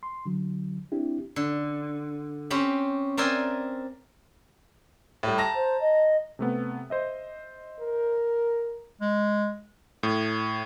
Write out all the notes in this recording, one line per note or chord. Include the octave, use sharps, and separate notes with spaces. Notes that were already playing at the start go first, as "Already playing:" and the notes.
C6
D3 F#3
C4 D4 E4 G4
D3
C4 C#4 G4 B5
C4 A#4 D5 E5 G5 G#5
A2 G3
A5 A#5 A#6
C5
D#5
C3 A3 B3
C5 D#5 E5
A#4
G#3
A2